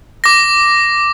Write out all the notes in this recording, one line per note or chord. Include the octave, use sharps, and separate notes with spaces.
D6 A#6